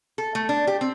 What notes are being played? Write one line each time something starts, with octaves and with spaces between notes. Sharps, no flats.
A4
A3
D4
G4
C4